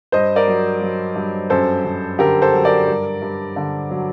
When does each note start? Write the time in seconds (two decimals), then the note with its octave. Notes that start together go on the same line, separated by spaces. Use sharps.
0.12 G2 C5 D#5
0.36 A#4 D5
0.47 F#3
0.82 F#3
1.16 G2
1.50 F#2 A4 C5
1.85 F#2
2.19 D3 G4 A#4
2.42 A4 C5
2.53 F#3
2.65 A#4 D5
2.87 G2
3.22 G2
3.56 D3
3.91 F#3